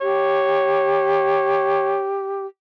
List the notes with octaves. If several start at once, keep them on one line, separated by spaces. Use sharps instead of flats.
G4 C#5